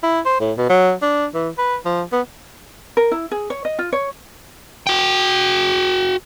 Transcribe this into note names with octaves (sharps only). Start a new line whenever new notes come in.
E4
C5
A2
B2
F#3
D4
E3
B4
F3
B3
A#4
E4
G#4
C#5
D#5
F4
C#5
F#4 G5